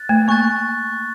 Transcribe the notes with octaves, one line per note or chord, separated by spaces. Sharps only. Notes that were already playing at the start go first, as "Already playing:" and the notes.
Already playing: F#6 A6
A3
A#3 C#6 F#6 A6